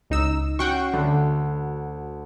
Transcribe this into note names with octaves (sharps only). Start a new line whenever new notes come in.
C#2 D#4 E6
C#4 F#4 F#5 G5 C#6 C7
D2 D3